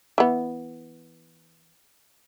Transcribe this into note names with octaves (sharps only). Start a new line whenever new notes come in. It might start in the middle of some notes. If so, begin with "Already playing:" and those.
E3 B3